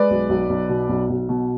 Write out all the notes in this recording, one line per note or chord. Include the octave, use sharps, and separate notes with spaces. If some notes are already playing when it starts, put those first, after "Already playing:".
Already playing: G#3 B4 D5
B1
B1
B1
B2
B1
B1
B2